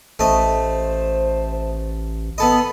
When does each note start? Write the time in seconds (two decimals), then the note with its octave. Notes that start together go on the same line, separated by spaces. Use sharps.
0.19 A1 A3 C5 D#5
2.38 B3 A4 D#5 B5